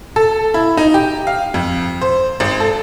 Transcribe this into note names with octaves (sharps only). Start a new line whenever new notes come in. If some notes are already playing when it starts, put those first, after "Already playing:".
A4
E4
D#4
G4
F5
F2
C5
G#1
A4